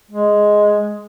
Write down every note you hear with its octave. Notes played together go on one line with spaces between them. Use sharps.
G#3